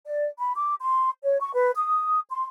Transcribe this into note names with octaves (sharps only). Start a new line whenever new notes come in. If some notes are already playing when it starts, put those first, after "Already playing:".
D5
B5
D6
C6
C#5
C#6
B4
D#6
C6